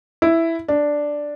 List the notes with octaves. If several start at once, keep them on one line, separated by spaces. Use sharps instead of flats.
E4
D4